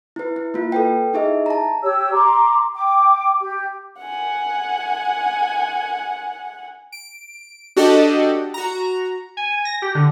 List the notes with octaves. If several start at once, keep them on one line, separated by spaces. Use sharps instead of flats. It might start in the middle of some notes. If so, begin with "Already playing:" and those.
E4 B4
E4
A#3 F4
A4 B4 G5
D#4 E4 G4 G#4 D#5 E5
A5 A#5
G4 C#5 E6
A#5 C6 D6
G5 D6
G4
F#5 G#5
D7
D4 F#4 G4 A4 D5 D#5
F#4 A#5
G#5
A#6
G4
D3